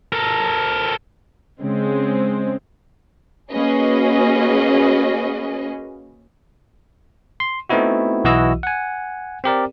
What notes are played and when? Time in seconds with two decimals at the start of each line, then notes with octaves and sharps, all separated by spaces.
0.12 A4 A#4
1.61 C#3 G#3 C4
3.51 A#3 C#4 F#4 G#4 B4 D#5
7.40 C6
7.69 A3 B3 C4 D#4 E4 F#4
8.24 B1 E3 E4 F#4 D#5 E6
8.63 F#5 G#5
9.44 C4 G4 A#4 D5